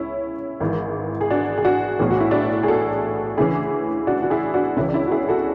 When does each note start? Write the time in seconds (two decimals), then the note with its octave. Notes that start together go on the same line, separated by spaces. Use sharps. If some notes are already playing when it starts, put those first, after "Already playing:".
Already playing: C#2 C#4 E4
0.60 G#1 G#2 E3
1.21 G#4
1.30 D4 F#4
1.58 G#4
1.65 D4 F#4
1.99 B1 A2 E3 G#4
2.10 F#4
2.20 E4
2.31 D4 F#4
2.63 G#4
2.68 F#4 A4
3.38 D2 C#3 E3 E4 G#4
4.07 D4 F#4
4.23 F#4
4.30 E4 G#4
4.54 D4 F#4
4.76 C#2 C#3 E3 C#4 E4
4.89 D4
4.94 C#4 E4
5.07 F#4
5.11 E4 G#4
5.28 F#4 A4